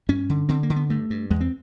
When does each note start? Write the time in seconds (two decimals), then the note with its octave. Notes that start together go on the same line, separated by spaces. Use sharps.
0.09 G2 C#4
0.30 D3
0.49 D3 C4
0.63 A#3
0.70 D3
0.76 B3
0.90 G2 A3
1.10 G2
1.31 E2 G#3
1.41 C4